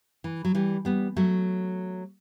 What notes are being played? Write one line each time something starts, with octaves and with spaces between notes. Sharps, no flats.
E3
F#3
E3 G3
G3 B3
F#3 A3